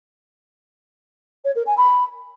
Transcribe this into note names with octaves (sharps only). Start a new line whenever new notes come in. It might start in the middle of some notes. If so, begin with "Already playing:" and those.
C#5
A#4
G#5
B5